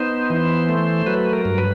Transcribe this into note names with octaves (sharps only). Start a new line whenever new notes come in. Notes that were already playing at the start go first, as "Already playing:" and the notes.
Already playing: B3 D#4 C5
E3
A3
F#3 B4
A#4
G2
B4